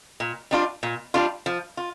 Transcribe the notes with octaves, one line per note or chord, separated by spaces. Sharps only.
A#2
G3 D4 F4
A#2
G3 D4 F4
F3
F4